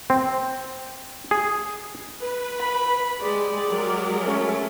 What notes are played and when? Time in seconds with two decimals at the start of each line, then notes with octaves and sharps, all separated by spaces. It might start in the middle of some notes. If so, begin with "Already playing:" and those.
0.10 C4
1.31 G#4
2.21 B4
2.60 B5
3.20 G#3 G4 D5
3.70 F#3 G#3 A#4
4.23 A3 C#4